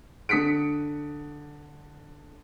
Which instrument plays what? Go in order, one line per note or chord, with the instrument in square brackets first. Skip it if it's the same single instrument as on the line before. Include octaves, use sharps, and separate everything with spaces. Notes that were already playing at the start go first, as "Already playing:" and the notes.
[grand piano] D3 D#6 B6 C#7 D7